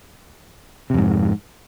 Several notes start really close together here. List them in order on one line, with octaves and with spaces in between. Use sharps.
C3 F2 G#2